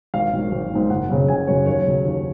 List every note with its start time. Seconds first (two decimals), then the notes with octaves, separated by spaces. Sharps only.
0.14 G#1 F5
0.33 G#2 D#3 F#3
0.52 G#1
0.71 G#2 D#3 F#3
0.90 F#1 F#5
1.09 F#2 C#3 F#3
1.28 F#1 G#5
1.47 F#2 C#3 F#3 C#5
1.66 D#2 C#5
1.85 C#3 F#3
2.05 D#2